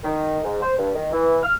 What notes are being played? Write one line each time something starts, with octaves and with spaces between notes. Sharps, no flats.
D#3
G#2
C5
G2
D#3
E3
F6